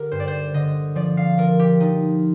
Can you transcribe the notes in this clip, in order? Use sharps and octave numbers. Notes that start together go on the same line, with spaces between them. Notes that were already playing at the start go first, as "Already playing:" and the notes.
Already playing: D3 G4 A#4
G2 C5
D5
C5
D3 D#5
F3 D5
F5
F3 A#4
G4
F3 D#4